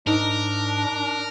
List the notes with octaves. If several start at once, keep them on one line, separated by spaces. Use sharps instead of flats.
G#2 D4 D#4 A#4